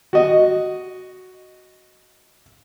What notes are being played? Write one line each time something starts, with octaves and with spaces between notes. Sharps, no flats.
F#4 D#5